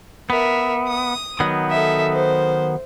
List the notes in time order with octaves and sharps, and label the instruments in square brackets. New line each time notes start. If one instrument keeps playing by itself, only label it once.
[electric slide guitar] B3 [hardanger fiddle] A#4 E5
[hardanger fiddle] D#6
[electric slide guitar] D#3 F#3 B3
[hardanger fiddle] A4 E5
C5